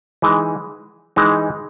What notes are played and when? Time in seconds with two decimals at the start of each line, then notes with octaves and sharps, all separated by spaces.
0.22 E3 G#3 D#4 G#4
1.16 E3 G#3 D#4 G#4